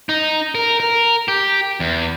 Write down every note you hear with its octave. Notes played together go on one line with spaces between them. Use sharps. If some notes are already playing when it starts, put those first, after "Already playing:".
D#4
A#4
A#4
G4
E2